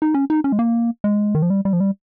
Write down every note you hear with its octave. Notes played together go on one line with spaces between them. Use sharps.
D#4
C#4
D#4
C#4
G#3
A#3
G#3
D#3
F3
G3
G3
F3
G3